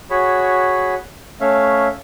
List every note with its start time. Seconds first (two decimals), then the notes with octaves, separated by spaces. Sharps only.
0.10 F#4 G#4 C#5 B5
1.41 A3 C#4 C#5 E5 F5